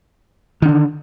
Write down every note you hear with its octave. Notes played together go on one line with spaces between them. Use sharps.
D3 D#3 D4